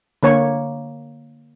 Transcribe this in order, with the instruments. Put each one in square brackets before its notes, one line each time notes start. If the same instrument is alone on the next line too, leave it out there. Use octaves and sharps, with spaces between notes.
[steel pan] D3 A#3 C#5